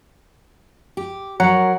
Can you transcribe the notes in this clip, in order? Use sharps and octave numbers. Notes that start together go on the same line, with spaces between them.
G4
F#3 A#4 C#5 F#5 A#5